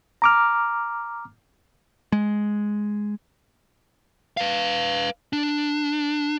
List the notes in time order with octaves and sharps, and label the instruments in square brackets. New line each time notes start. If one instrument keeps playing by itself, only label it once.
[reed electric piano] A#5 D6 F6
[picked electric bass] G#3
[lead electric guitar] B4 F5
D4